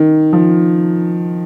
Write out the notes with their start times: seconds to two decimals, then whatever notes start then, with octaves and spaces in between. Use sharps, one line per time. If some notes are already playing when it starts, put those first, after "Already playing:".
Already playing: D#3
0.33 F3